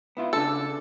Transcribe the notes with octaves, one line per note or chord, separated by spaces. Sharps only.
B3 E4 F4
C#3 D4 A4 A5